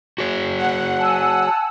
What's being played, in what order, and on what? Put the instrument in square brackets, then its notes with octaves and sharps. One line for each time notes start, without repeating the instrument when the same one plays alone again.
[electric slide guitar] F#4 G#4 C#5
[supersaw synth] F#5
[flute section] G#5 A5 E6